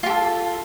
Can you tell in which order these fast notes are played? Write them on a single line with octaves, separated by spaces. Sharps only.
F4 G4 A4